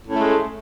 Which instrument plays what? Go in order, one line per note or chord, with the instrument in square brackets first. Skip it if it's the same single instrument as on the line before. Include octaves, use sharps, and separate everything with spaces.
[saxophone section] A2
C#4
A3
G#3